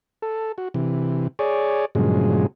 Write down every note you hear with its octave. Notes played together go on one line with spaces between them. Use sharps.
A4
F#4
C3 E3
G#4 C#5 D5
G2 A#2 C#3 F3 F#3 G#3